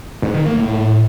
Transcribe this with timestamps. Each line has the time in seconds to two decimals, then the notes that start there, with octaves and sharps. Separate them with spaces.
0.22 G#2
0.34 D#3
0.46 A#3
0.57 A2